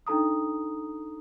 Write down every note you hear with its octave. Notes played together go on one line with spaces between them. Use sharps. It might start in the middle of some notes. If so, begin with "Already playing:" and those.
D4 D#4 A4 A#5 D#6